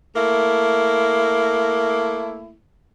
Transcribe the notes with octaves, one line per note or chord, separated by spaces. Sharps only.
A3 A#3 E4